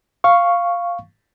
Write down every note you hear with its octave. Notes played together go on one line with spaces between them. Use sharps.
F5 C#6